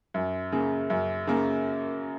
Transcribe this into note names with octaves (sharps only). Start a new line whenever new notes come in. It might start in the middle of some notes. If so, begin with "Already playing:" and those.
F#2
C#3 A#3
F#2
C#3 A#3